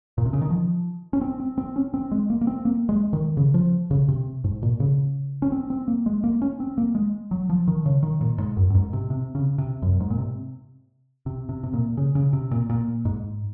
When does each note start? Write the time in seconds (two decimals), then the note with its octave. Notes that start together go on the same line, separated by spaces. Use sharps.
0.18 A#2
0.26 C3
0.33 C#3
0.42 D#3
0.50 F3
1.13 C#4
1.21 C4
1.40 C4
1.58 C4
1.76 C#4
1.94 C4
2.11 G#3
2.30 A#3
2.41 A#3
2.47 C4
2.65 A#3
2.89 G#3
3.13 D#3
3.37 C#3
3.54 F3
3.91 C#3
4.08 C3
4.44 G#2
4.63 A#2
4.80 C#3
5.42 C#4
5.52 C4
5.70 C4
5.88 A#3
6.06 G#3
6.24 A#3
6.42 C#4
6.60 C4
6.78 A#3
6.95 G#3
7.31 F#3
7.50 F3
7.68 D#3
7.86 C#3
8.03 D#3
8.21 A#2
8.38 G#2
8.57 F#2
8.70 F#2
8.75 G#2
8.93 C3
9.10 C3
9.35 C#3
9.58 C3
9.82 F#2
10.00 G#2
10.10 A#2
10.18 C3
11.26 C3
11.49 C3
11.63 C3
11.73 A#2
11.97 C#3
12.15 C#3
12.33 C3
12.51 A#2
12.70 A#2
13.05 G#2